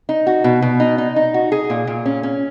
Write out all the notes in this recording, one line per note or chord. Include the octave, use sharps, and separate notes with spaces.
D#4
F#4
B2
B2
D#4
D#4
D#4
F#4
G#4
A#2
A#2
C#4
C#4